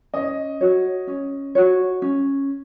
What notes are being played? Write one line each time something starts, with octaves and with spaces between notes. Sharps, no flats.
C#4 D#5
F#4 C#5
C#4
F#4 C#5
C#4